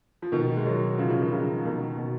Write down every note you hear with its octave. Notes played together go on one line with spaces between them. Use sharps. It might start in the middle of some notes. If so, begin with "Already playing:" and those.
F3
B2 D#3
G#3
D#3 F#3
C#3 F3
C#3
D#3
C#3 F3
B2 D#3
B2